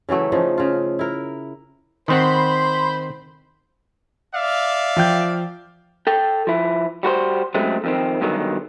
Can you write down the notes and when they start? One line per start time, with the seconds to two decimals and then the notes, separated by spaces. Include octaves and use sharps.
0.09 C#3 E3 F#3 A3
0.32 C#3 F3 D#4
0.58 C#3 F4
0.99 E4 A#4
2.08 D#3 C4 C5 F#5 B5 C6
4.33 D5 E5 F5
4.96 F3 G5 G6
6.07 A4 G5
6.47 F3 E4
7.03 G3 F#4 B4 C5
7.54 F#2 F#3 G#3 A3 C4
7.84 F2 D#3 C4
8.21 G2 B2 D3 D#3 F#3 G#3